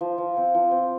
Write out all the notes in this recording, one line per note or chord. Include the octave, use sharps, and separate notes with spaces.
F3
F3
C4
F3
C4